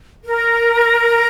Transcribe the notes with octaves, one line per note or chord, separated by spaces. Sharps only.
A#4